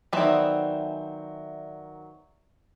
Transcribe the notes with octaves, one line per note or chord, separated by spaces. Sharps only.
D#3 F#3 B3 C4 D#4 D5 E5 G#5